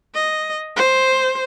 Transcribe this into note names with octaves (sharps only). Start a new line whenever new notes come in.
D#5
C5